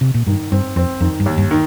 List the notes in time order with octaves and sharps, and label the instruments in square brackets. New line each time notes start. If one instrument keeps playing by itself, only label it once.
[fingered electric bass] C3
A#2
[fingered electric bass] G2 [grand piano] D#3
[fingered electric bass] G2 [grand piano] C4
[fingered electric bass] F2 [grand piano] C4
[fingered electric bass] F2 [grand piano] D#3
[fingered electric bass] G2
[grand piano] D#2
[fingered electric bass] G2
[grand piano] D#3